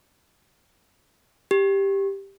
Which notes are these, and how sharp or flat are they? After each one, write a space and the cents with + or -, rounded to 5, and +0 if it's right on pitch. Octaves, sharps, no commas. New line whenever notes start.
G4 +5